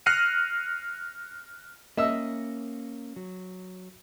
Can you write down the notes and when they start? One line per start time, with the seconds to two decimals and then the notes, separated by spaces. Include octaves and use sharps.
0.06 F6 F#6 A#6 C7 C#7 D#7
1.97 A#3 C#4 D#5 E5 E6
3.16 F#3